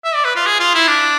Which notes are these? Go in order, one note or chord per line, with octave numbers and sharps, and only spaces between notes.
E5
D5
B4
F4
G#4
F4
E4
D4